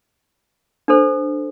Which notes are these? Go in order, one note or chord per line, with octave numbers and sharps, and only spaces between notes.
D4 A4 C5